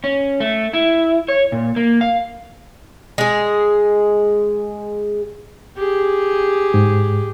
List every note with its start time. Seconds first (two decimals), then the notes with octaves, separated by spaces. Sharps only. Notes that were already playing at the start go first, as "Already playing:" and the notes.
0.04 C#4
0.40 A3
0.73 E4
1.28 C#5
1.52 A#2
1.76 A#3
2.01 F5
3.18 G#3 G#4
5.76 G4 G#4
6.74 G#2